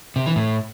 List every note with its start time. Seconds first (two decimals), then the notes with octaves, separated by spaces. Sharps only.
0.16 C3
0.26 E3
0.36 A2